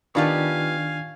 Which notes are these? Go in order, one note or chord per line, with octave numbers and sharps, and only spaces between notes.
D#3 B3 D4 F4 G4 F5 G#5 C#6